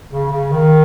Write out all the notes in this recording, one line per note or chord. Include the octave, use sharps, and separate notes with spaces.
C#3
C#3
D#3